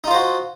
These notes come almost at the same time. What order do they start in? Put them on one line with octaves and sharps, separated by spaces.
D#4 F4 C5 F#4